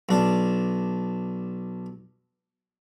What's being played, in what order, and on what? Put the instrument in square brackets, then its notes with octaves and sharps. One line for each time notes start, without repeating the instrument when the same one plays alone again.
[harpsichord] B1 D4